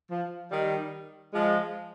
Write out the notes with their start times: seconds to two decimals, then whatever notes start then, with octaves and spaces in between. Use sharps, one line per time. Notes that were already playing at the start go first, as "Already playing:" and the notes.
0.11 F3
0.51 D#3 G3
1.33 F3 G#3